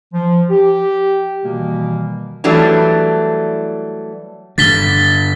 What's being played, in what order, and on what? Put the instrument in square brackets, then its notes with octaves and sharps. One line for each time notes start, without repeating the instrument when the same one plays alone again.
[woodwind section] F3
G4
B2 D#3 E3 G3 A#3
[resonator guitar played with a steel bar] E3 F#3 G3 A3 D4
[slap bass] G2 D3 [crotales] A6 B6 G7